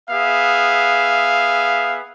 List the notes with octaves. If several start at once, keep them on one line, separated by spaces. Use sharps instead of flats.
B3 G#4 E5 F5